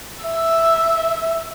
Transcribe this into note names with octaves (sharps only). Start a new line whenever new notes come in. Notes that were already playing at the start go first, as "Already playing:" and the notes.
E5